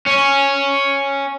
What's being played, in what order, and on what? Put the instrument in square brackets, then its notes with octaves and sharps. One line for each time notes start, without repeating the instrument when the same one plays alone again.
[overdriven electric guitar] C#4